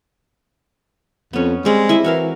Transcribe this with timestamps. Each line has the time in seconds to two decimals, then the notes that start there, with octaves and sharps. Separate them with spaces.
1.33 F2 B3 C#4
1.65 G3 G#3 C4
1.89 E4 D#5 E5
2.04 E3 F#4 A#4 F5